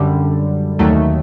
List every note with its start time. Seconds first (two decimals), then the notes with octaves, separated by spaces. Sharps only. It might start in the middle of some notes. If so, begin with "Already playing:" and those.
Already playing: F#2 D3 G3
0.79 D#2 D#3 F#3 A3